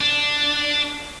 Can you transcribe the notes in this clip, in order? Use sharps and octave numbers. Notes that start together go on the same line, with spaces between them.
D4